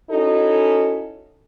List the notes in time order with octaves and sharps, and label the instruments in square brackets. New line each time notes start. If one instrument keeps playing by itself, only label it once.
[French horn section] C#4 D#4 E4 F#4 A4